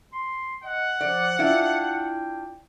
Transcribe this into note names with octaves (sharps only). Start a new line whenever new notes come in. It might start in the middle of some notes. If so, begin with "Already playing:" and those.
C6
D#5 F#5
F3 D5
D4 E4 F4 G5